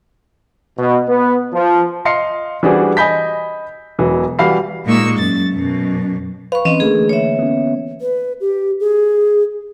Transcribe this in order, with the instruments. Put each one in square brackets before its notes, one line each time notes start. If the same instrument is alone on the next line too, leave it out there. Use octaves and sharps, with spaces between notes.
[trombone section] B2
B3
F3
[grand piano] D#5 F5 C6 C7 C#7
E3 G3 D4 F#4 G#4 C5
D#5 G#5 B5 G6 B6
E1 E3 F#3
E3 G3 F#4 F5 B5 C7
[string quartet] A#2 G#3 A#3 D#4 C#6 E6
F#2 A6
F#2 B2
[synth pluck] B4 [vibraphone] F5 C#6
[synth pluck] E3 [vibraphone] C4 C#4 D#5
[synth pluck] D3 A3 A#3 [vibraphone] G#4
[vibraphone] C#5 E5
[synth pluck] B3 C#4
[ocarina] B4
G4
G#4